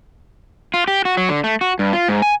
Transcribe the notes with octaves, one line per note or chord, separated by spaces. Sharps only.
F4
G4
F#4
F#3
D3
A3
F#4
G2
F4
G#2
G#5